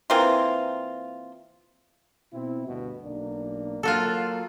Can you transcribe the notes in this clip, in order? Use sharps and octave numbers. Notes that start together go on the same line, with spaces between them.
E3 A#3 C4 F4
B2 C4 E4
D2 G2 B2
B1 A#3 D4
F#3 A#3 F4 F#4 A4